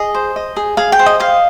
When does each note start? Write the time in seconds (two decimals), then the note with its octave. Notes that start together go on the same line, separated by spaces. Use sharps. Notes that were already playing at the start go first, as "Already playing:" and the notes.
Already playing: G#4 D#5
0.15 C5
0.36 D#5
0.56 G#4
0.77 G#4 F5
0.92 G5
0.99 C5
1.06 D#5
1.20 D#5 F5